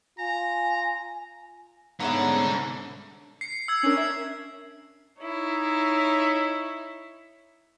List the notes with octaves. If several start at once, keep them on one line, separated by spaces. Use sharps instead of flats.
F4 G#5 A#5
C2 G#2 D3 B3 C#4 E5 F#5 A#5
C7 C#7
E6 G#6
C#4 D4 A#4
E5
D#4 E4 C#5